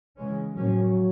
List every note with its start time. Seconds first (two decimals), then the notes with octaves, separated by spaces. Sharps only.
0.17 C#3 E3 G#3 C#4
0.55 A2 F3 F#3 A#3 C#4